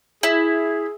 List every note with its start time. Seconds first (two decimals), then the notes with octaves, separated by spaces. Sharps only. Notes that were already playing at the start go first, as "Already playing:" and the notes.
0.23 E4 G#4